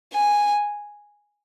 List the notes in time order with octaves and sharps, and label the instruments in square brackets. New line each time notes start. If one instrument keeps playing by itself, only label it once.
[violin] G#5